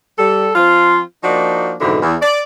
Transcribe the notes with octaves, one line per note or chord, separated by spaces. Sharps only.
G3 A4
F3 C4 F4
F3 A#3 D4 D#4 F#4
F2 G#2 B2 D3 E3
E2
D5